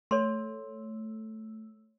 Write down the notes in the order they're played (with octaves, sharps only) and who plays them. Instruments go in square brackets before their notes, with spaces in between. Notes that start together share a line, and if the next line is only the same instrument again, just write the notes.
[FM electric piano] A3 [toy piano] C#5 C6